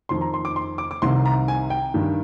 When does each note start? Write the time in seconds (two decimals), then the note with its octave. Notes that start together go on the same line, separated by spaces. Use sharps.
0.09 F2 D#3 C6
0.21 A#5
0.34 C6
0.45 D6
0.56 C6
0.78 D6
0.91 D6
1.02 C2 C3 D#3 C6
1.25 A#5
1.48 G#5
1.70 G5
1.94 G2 D#3